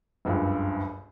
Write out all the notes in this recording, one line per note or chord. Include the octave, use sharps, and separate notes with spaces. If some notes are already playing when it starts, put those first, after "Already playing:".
F#1 C#2 G2